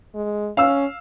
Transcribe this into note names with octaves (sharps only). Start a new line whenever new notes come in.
G#3
C#4 F5 E6